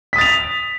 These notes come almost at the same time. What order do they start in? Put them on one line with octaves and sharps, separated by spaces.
B6 D#6 A6 F7